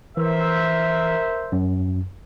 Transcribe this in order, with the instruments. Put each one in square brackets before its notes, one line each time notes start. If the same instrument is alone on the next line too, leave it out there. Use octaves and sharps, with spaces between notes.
[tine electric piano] E3 [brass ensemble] A#4 C5 E5
[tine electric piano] F#2